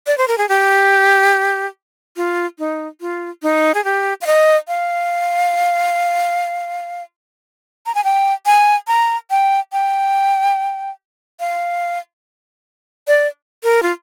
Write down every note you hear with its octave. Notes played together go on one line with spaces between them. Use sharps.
D5
C5
A#4
G#4
G4
F4
D#4
F4
D#4
G#4
G4
F5
D#5
F5
A#5
G#5
G5
G#5
A#5
G5
G5
F5
D5
A#4
F4